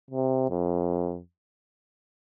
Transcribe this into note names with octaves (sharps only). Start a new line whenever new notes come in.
C3
F2